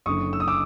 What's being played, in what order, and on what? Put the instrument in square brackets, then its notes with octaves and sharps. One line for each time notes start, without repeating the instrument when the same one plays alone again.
[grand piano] F#1 F#2 D3 C#6 D#6
E6
D#6
D6 E6